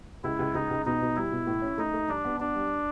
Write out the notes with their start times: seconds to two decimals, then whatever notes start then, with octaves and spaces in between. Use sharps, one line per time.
0.24 C#2 E4
0.39 C#2
0.54 C#2 D#4
0.71 C#2
0.86 B2 D#4
1.01 B2
1.16 G3 E4
1.32 B2
1.47 A2
1.62 C#4
1.78 A3 D#4
1.93 A3
2.08 G2 D4
2.25 B3
2.39 B3 D4
2.55 G3